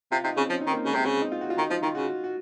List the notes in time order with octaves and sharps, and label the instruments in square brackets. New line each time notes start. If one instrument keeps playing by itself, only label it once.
[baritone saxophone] C3 [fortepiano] F4
[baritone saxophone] C3 [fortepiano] D#4
[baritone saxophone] C#3 [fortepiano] C4
[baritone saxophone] F3 [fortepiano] C#4
[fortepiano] D#4
[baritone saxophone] D#3 [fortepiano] C4
[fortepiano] A#3
[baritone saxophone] C#3 [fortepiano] G#3
[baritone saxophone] C3 [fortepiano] C4
[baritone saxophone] C#3
[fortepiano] D#4
F4
F#4
F4
[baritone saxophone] D#3 [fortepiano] D#4
[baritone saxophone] F3 [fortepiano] F4
[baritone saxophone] D#3 [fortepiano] F4
[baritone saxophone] C#3 [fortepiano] F#4
[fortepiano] F#4